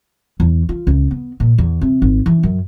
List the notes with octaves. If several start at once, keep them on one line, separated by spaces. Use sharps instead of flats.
E2
F4
C#2
B3
A#2
E2
C3
G#1
E3
F#2